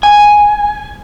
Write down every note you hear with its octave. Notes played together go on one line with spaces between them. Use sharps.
G#5